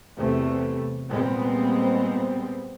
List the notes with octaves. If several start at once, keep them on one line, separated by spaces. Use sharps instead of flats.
E2 C3 A3
A#2 G3 G#3 B3 C4